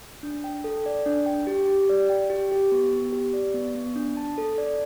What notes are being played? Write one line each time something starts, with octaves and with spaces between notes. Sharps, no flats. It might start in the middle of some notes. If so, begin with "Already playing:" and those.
D4
G5
A4
D5
D4
G5
G4
G4
D5
G5
G4
G4
B3
B3
G4
D5
B3
B3
D4
A5
A4
D5